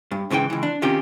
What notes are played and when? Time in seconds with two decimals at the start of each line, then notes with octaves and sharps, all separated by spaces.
0.11 G2
0.30 G#2 C#3 E3 B4 G5
0.50 C#2 E3
0.63 D4
0.82 C3 D#3 C#4 F4 G4